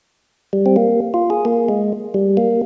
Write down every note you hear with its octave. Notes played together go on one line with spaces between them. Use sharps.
G3
C4
A#3
F4
G#4
A#3
G#3
G3
A#3